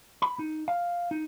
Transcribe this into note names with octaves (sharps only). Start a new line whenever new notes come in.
B5
D#4
F5
D#4